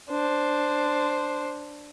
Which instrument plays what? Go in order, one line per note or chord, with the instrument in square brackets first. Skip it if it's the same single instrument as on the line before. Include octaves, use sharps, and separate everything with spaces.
[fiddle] D4 C5